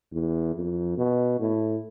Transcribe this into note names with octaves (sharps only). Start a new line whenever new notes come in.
E2
F2
B2
A2